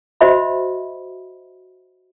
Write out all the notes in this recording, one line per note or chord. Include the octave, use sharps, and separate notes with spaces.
F#4 C5 D#5 E5 B5